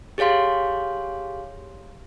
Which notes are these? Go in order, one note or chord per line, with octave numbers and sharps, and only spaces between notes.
G4 G#4 C#5 F5 C6